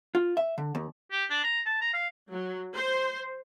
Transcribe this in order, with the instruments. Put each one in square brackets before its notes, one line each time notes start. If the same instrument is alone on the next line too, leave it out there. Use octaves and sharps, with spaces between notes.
[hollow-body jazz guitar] F4
E5
D3
D#2
[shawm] G4
D4
A#5
A5
A#5
F5
[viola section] F#3
C5